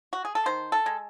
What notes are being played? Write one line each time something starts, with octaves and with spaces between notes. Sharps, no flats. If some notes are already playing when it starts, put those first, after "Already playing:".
F#4
G#4
A4
D#3 C5
A4
G#3